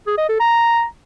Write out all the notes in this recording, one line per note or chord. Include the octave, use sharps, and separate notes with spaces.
G#4
D#5
A4
A#5